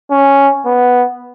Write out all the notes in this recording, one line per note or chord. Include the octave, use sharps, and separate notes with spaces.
C#4
B3